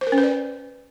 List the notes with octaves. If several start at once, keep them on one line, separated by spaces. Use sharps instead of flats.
C5
A#4
C#4
B4
D5